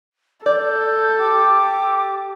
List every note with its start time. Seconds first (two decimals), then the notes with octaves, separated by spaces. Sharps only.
0.46 A4 D5 G6
1.19 G4 D6